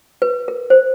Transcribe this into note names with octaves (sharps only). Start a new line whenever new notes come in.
B4
A#4
C5